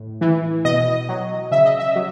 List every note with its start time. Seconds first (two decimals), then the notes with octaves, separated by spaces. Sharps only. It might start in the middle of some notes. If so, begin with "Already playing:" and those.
Already playing: A2
0.21 E3
0.65 B2 D#5
1.09 F#3
1.51 C#3 E5
1.65 D#5
1.79 E5
1.96 F#3